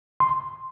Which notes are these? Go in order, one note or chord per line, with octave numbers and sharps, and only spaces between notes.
C6